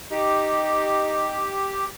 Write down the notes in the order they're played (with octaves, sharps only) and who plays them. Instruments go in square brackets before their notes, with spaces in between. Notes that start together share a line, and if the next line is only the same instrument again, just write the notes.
[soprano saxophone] D#4 [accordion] G4